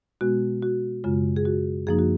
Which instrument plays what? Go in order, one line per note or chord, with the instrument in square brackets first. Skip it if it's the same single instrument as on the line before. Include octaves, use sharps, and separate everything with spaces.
[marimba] B2 G#3 B3 F#4
F#4
F#2 C#3 G#3 F4
G#4
F#4
F#2 F3 A#3 D#4 G#4
F#4